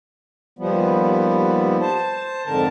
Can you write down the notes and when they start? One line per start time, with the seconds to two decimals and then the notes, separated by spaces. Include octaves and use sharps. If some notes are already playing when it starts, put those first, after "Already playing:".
0.59 D#2 F3 G3 B3
1.81 C5 A5
2.46 F2 G#2 D3 A#4 A5